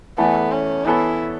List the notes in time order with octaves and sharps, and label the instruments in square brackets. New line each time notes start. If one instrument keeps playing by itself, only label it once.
[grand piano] E2 E3 A3 E4 A4 [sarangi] B3
[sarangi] C#4
[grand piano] E3 B3 A4 C#5 [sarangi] E4